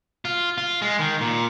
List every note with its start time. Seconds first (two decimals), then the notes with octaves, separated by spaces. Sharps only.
0.25 F4
0.58 F4
0.82 G#3
0.99 D#3
1.21 A#2